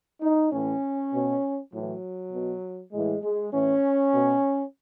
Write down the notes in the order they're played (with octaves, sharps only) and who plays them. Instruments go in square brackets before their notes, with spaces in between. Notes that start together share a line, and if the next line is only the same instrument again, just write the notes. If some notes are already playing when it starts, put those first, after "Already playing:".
[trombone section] D#4
A2 E3 C#4
B2
A2 E3 F#3
B2
A2 E3 G#3
G#3
A2 E3 C#4
B2